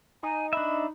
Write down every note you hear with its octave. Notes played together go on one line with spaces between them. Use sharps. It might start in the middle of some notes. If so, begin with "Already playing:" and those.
D#4 G#5
D4 E5 B5